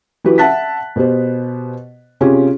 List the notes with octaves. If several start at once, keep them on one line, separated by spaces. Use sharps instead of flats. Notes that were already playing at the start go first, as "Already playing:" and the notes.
E3 F#3 F#4 G4 B4
E5 F#5 A5 F#6 B6
B2 B3 G4 C5
C3 C#4 F4 G4 G#4